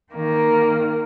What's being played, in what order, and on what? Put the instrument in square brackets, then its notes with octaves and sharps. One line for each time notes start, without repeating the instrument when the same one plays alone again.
[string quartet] D#3 A#3